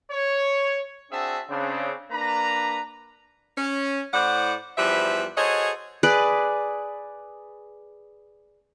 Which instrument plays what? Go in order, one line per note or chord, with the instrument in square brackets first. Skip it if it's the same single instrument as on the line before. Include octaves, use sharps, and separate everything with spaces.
[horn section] C#5
C4 D4 F#4 G#4 E5 A5
C#3 C4 D4
A#3 D4 B4 A#5
[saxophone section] C#4
A2 E4 C5 D5 F#5
E2 F3 G3 B4 E5
F#4 G#4 A4 C5 C#5 D#5
[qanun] G#4 B4 D5